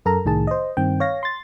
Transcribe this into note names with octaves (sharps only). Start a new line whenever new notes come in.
F#2 A4 A#4 A#5
C2 A2 D#3 G#4 A5
C5 D#5
G2 D#3 C4 G5
C#5 F5 A#6
C6 A6